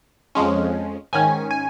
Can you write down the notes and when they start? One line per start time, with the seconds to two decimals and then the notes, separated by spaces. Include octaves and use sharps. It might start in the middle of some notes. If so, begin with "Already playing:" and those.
0.35 F2 F3 G#3 C#4
1.13 G#2 D#3 C#4 G#5
1.51 G#5